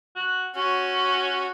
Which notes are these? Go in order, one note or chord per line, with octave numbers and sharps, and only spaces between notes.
F#4
C#4 F#4